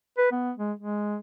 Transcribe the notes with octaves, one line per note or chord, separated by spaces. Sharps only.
B4
B3
G#3
G#3